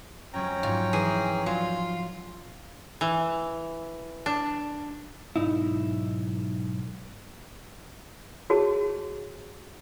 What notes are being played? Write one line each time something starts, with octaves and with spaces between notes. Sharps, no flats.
F2 F#3 G#3 C#4 G5 A#5
G#2 F3 F4 F#4
E3 G#4
F#3 F4 C6
E3
D4
B1 G#2 D#4 E4
F#4 G#4 C#5 A5